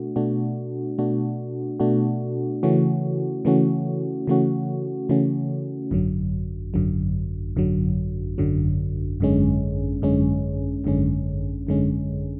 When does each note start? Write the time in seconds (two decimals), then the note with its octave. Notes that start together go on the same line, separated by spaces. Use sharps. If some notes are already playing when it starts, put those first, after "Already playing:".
Already playing: B2 A3 D4 F#4
0.16 B2 A3 D4 F#4
0.98 B2 A3 D4 F#4
1.80 B2 A3 D4 F#4
2.63 C#3 E3 A3 C#4 F#4
3.45 C#3 E3 A3 C#4 F#4
4.27 C#3 E3 A3 C#4 F#4
5.09 C#3 E3 A3 C#4 F#4
5.91 G#1 F#2 D3 F#3
6.74 G#1 F#2 D3 F#3
7.56 G#1 F#2 D3 F#3
8.38 G#1 F#2 D3 F#3
9.20 G#1 F#2 D3 G#3 C#4
10.02 G#1 F#2 D3 G#3 C#4
10.84 G#1 F#2 D3 G#3 C#4
11.67 G#1 F#2 D3 G#3 C#4